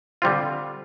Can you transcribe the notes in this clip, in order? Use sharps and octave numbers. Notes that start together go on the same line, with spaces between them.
D3 G3 C4 F4